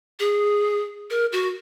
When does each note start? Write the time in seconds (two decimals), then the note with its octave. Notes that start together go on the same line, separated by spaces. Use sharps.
0.20 G#4
1.10 A#4
1.32 F#4